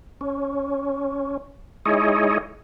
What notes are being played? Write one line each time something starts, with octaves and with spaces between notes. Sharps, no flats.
C#4
G#3 D#4 E4 G#4 C#5 D#5